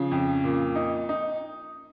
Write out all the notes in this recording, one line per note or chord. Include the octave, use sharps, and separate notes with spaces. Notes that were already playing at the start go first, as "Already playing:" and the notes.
Already playing: C#3 F3
F2
A#2
D#4
D#4